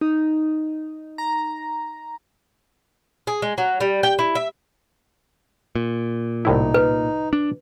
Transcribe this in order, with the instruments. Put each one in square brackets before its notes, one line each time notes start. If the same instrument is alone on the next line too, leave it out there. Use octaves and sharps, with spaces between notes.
[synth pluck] D#4
A#5
[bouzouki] G#4
G#3
F#3
G3
G5
E4
E5
[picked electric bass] A#2
[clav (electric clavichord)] C2 A2 E4 [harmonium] D#4
[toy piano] B4
[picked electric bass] D4